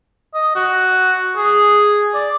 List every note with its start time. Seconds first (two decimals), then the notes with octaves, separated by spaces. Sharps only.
0.35 D#5
0.55 F#4
1.37 G#4
2.14 D5